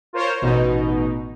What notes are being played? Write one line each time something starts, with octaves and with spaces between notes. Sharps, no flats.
F4 A#4 C5 C#5
A1 B2 D#4